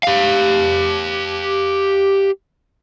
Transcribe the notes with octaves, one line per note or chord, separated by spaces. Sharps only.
G4 F5